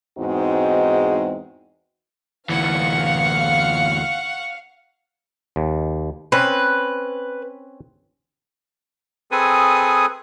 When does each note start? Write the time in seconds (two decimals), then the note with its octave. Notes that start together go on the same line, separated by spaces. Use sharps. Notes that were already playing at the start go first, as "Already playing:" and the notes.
0.19 E2 G#2 G#3 C4 D#4 F#4
2.49 D2 E3 F5 F#5 C#6
5.56 D#2
6.32 C4 C#4 B4 C5
9.31 C4 G#4 A4 B4 G#5 D#6